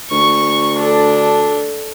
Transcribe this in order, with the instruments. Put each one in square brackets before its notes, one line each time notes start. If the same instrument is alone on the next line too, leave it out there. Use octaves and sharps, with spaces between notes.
[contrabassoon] D2 [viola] C#6
[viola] D4 A4